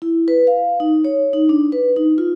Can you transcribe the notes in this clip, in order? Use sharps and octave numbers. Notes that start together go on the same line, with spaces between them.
E4
B4
F5
D#4
C#5
D#4
D4
B4
D#4
F4